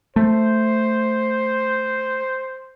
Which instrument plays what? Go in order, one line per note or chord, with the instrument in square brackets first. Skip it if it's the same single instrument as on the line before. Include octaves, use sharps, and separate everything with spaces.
[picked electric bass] A3 [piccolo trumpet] C5